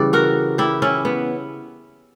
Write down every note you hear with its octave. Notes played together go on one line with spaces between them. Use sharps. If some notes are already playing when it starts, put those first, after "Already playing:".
Already playing: C#3 E3 G3 D5
F#4 A#4
E4 G4
C#4 E4
B3